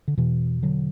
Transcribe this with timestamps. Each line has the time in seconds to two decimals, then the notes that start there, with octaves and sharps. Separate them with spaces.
0.08 D3
0.17 E2 B2 E3
0.63 D3 F#3